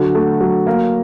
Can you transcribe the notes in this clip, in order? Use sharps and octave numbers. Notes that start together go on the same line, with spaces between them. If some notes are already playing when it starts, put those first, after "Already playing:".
Already playing: D3 F#3 F#4
A3
F#3
A#3